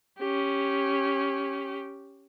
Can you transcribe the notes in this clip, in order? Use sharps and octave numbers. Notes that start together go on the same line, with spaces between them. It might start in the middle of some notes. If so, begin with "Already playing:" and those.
C#4 G4